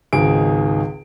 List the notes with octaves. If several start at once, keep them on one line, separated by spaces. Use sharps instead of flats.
G#1 C#2 D#3 G#4 D7